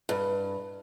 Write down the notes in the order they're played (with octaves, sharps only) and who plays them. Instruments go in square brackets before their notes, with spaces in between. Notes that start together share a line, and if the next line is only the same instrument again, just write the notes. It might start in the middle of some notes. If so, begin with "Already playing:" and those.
[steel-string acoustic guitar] G2